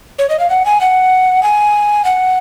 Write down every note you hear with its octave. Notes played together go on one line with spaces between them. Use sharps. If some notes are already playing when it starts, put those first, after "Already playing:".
C#5
D#5
F5
F#5
G#5
F#5
G#5
F#5